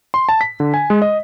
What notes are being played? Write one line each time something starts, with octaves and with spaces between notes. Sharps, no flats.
C6
A5
B6
D3
G#5
G#3
D#5